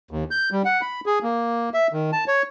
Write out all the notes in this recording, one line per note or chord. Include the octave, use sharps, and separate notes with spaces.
D#2
G6
G3
F#5
B5
G#4
A#3
E5
D#3
A5
C#5